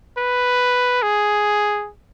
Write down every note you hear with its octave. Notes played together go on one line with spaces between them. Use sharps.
B4
G#4